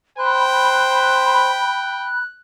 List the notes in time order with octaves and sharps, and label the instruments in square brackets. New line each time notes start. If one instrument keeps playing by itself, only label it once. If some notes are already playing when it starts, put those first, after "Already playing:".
[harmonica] C5 [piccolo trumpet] G5 [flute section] B5 [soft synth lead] F#6